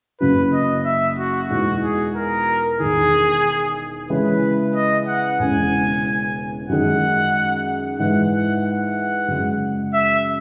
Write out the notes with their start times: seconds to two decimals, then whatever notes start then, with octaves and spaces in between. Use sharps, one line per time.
0.20 F#1 F#2 C#3 F#3 B4
0.53 D#5
0.85 E5
1.18 F#4
1.50 E2 B2 G#3 D#4 F#4
1.82 G#4
2.15 A#4
2.80 E1 E2 D#3 G#4
4.10 C#3 E3 G#3 C#4 B4
4.75 D#5
5.07 F#5
5.39 E1 E2 C#3 G#3 G#5
6.69 F#2 D#3 G#3 D#4 G#4 F#5
7.98 G#2 E3 G#3 F#5
8.31 F#5
8.64 F#5
9.28 F#2 C#3 G#3
9.94 E5